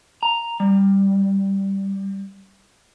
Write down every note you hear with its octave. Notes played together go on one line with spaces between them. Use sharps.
A#5
G3